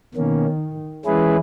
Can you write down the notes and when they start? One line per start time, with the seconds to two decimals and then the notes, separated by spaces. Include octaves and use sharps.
0.15 B2 D#3 A#3 C#4
1.05 E3 G#3 C#4 E4 G#4 B4